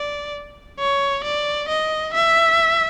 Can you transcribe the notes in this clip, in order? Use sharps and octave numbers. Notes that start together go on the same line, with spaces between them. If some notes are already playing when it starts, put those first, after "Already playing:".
Already playing: D5
C#5
D5
D#5
E5